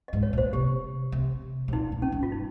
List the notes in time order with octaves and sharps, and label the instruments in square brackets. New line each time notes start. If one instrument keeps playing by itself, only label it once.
[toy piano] D#5
[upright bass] G#2
[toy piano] C#5
[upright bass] A#2
[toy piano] C5
[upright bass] C3 [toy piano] G4
[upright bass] C3
C3
[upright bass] A#2 [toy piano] D#4
[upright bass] A#2
[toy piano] C#4
[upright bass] G2
[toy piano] F4
D#4